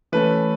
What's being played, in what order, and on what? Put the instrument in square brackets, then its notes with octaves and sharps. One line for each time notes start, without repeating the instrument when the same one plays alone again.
[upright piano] E3 A3 C#4 B4